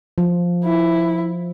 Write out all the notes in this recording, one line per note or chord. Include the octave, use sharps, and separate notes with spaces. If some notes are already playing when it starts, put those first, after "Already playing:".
F3
E4